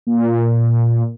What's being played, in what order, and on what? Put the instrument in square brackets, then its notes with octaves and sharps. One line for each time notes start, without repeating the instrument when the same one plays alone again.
[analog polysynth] A#2